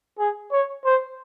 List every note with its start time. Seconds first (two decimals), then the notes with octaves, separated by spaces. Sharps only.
0.19 G#4
0.52 C#5
0.85 C5